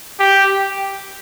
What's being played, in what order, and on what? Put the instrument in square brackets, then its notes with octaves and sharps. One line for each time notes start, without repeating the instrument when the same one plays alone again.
[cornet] G4